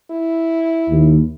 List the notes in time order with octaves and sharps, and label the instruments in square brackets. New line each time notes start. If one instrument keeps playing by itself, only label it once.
[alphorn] E4
[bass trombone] D#2